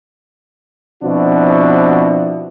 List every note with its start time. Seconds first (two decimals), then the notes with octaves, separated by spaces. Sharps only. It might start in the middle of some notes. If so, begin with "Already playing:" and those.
1.03 B2 F3 C4 D4 E4 F#4